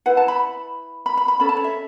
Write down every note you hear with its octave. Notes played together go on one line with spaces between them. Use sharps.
E4 B4 F#5
A5
B5
B5
B5
B5
C#4 A4 B5
A5
C#5
E5